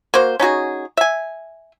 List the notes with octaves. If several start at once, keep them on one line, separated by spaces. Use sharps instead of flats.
A#3 F#4 C5
C#4 D#4 F#4 G#4
E5 G#5